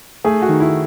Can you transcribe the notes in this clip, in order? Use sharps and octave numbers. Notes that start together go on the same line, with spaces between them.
A3 G#4
F#4
D#3
E4